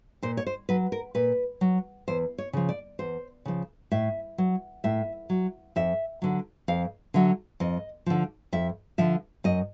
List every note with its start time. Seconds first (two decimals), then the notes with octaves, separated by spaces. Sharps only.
0.22 A#2 C5
0.37 C#5
0.47 C5
0.69 F#3 B4
0.92 A#4
1.15 A#2 B4
1.61 F#3
2.08 E2 C5
2.38 C#5
2.53 C#3 F3
2.69 D5
2.99 E2 C5
3.45 C#3 F3
3.91 A2 E5
4.38 F#3
4.84 A2 E5
5.30 F#3
5.76 F2 E5
6.22 D3 F#3
6.68 F2 F5
7.14 D3 F#3 E5
7.60 F2 D#5
8.06 D3 F3
8.52 F2 E5
8.98 D3 F3 E5
9.44 F#2 D#5